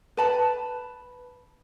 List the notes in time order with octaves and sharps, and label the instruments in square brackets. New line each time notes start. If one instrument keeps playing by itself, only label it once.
[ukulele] B4 A5 B5